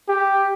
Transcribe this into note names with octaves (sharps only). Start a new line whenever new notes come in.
G4